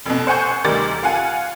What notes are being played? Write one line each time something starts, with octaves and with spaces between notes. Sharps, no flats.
F1 B2
C5 F#5 G#5 C#6 G6
D2 D#3 G3 A#4 D6 A6
F4 F5 F#5 G#5